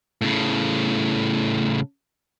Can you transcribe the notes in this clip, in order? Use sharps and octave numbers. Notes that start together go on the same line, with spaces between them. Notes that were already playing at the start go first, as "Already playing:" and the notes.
A2 C#3